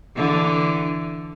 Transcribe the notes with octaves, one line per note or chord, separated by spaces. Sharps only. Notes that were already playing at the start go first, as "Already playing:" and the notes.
D3 E3